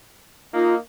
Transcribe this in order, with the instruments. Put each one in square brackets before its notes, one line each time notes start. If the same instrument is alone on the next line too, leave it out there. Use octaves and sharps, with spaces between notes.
[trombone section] A#3 D#4 [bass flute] F4